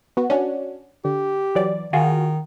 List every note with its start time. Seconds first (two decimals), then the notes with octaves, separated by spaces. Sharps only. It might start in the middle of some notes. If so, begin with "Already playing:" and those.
0.17 B3 F#4
0.30 C#4 D4 F#4
1.05 D3 G4
1.55 E3 F#3 D5
1.93 D#3 F4 F#4 G#4